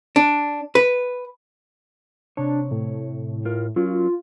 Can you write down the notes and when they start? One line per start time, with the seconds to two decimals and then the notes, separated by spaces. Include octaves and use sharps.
0.16 D4
0.75 B4
2.37 C3 D4 C#5
2.71 A2
3.45 F4 A#4
3.76 F#3 C#4 F4 A#4